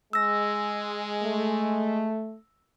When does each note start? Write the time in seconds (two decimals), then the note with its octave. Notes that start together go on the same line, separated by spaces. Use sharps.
0.13 G#3 E6 A#6
1.24 A3